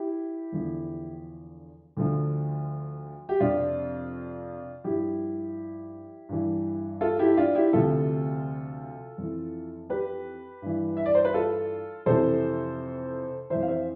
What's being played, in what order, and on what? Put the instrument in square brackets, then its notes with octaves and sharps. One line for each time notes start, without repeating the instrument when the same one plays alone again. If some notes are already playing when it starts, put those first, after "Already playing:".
Already playing: [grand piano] E4 G4
E2 D3 F3
D2 D3 F3
G4
F2 C3 F3 D4 F4
G2 F3 E4 G4
G2 E3
F4 A4
E4 G4
D4 F4
E4 G4
D2 C3 F3 F4 A4
F2 E3
G4 B4
G2 E3
E5
D5
C5
B4
F4 A4
F2 C3 E3 A4 C5
F2 E3 C5 E5
F5
C5 E5